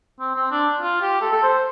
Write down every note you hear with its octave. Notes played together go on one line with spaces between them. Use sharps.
C4
C4
D4
F4
G4
A4
A4
C5